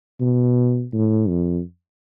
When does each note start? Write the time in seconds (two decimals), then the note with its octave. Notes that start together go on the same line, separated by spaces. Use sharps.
0.20 B2
0.93 A2
1.28 F2